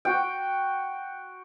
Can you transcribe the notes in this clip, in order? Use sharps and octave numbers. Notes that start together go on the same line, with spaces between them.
F#4 G5